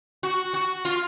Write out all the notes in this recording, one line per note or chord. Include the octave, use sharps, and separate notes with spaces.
F#4
F#4
F4